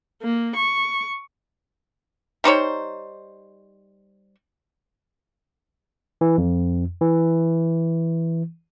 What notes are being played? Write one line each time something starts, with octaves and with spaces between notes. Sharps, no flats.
A#3
C#6
G3 D#4 C5 C#5
E3
F2
E3